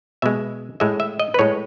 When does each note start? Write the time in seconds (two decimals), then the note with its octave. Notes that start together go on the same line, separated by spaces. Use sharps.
0.22 B2 G#3 E5
0.80 A2 G#3 E5
1.00 E5
1.20 D#5
1.34 B4
1.39 A2 G#3 C#5